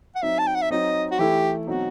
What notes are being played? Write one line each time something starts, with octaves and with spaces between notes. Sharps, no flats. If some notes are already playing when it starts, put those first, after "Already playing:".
F#5
F#3 C4 D#4 E5
A5
G5
F#5
E5
F#3 C4 D#4 D#5
F#4
E3 A3 E4 G4
B2 F#3 C4 D#4 F#4